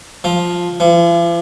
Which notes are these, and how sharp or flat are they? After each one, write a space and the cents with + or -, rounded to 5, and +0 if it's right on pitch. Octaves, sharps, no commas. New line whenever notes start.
F3 +5
F3 -45